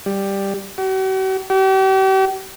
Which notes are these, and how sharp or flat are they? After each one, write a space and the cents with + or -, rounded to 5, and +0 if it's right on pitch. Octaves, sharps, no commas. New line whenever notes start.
G3 +5
F#4 +45
G4 -40